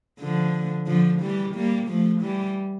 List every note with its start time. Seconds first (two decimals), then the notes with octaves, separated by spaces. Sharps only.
0.20 D3 F3
0.87 D3 F3
1.20 E3 G3
1.55 G3 A#3
1.88 F3 A3
2.21 E3 G3